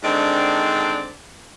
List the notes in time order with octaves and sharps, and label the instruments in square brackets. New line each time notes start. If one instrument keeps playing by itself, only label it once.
[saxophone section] G#2 D3 D#3 C4 D4 D5